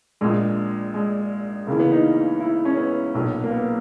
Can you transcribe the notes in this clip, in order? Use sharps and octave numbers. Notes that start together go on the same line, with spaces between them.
A#1 A#2 G#3
G#3
C#2 C#3 E3 A#3
B3
D#4
E4
C#4
B3
B1 A#2
A#3
B3